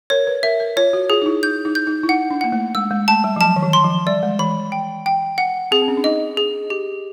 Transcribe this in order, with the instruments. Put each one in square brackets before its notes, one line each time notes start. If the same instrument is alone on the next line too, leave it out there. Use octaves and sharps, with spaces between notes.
[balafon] A#4 [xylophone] C#5
[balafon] B4
[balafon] A#4 [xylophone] E5
[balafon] A#4
[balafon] F4 [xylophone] C#5
[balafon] F#4
[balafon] F4 [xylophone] G#4
[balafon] D#4
E4
[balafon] D#4 [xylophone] G6
[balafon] D#4
[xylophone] G6
[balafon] D#4
E4
[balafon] D#4 [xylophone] F#5
[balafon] D4
[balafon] A#3 [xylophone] F#5
[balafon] A3
[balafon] G#3 [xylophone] E6
[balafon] G#3
[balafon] A3 [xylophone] A5
[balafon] G3
F3
[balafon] F#3 [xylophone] A5
[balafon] D#3
E3
[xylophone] C6
[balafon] F3
[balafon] G3 [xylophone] D5
[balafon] G#3
[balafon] E3 [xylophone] B5
[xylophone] G5
G5
F#5
[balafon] C4 [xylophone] G#4
[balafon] C4
C#4
D4
[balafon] D#4 [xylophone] D#5
[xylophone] G#4
G4